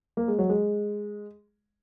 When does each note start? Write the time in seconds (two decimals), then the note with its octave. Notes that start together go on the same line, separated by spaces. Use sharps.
0.17 A#3
0.28 G#3
0.39 F#3
0.49 G#3